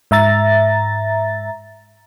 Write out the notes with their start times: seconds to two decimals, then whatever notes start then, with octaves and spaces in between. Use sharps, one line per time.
0.11 G#2 E5 A#5 A6